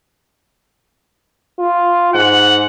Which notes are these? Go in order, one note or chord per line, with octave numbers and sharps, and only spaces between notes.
F4
G#2 F#5